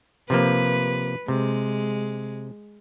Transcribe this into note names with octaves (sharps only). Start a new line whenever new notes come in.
C3 F3 A#3 B4
C3 G#3